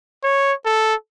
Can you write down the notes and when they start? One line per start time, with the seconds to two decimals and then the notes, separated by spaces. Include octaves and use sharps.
0.24 C#5
0.65 A4